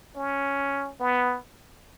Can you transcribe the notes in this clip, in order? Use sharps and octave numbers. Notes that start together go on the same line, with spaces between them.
C#4
B3